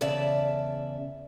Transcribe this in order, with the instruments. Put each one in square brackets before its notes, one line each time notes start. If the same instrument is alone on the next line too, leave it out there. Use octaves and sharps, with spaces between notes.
[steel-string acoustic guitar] E2 C#3 D5 E5 A5